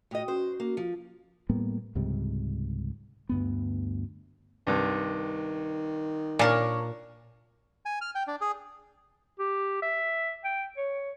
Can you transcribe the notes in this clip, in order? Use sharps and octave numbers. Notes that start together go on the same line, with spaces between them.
A2 F#4 D#5 G5 D#6
C#4 F#4 C5
A#3
F3
A2 G3 A#3 B3
C#2 G#2 C3 G3
D2 G2 B3
C2 G2 D#3
A#2 D4 A#4 C#5
G#5
F6
G5
D4
G#4
G4
E5
G5
C#5